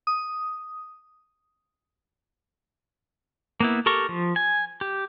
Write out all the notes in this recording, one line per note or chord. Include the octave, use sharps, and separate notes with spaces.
D#6
A#3 B3 E4
G4 A4 A#4 C#6
F3
G#5
G4